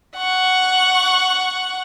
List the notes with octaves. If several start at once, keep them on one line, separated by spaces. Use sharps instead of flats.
F#5 C#6